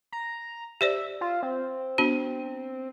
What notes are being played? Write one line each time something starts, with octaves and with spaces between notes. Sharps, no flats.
A#5
G4 C5 D5 E5
F4
C4
B3 D4 F#4